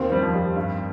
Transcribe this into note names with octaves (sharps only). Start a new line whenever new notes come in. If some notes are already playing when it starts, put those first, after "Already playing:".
Already playing: D#2 D#3 C4
G3 C4
F2 F3
G3
G2